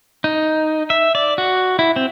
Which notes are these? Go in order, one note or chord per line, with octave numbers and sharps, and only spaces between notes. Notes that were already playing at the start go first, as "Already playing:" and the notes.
D#4
E5
D5
F#4
E4
C4